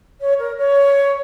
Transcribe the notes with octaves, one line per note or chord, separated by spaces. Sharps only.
C#5
A#4
C#5